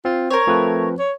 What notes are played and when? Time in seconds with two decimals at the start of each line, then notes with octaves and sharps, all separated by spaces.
0.05 C4 F4
0.30 A#4 C5 C#5
0.47 F3 A3 C4 B4
0.99 C#5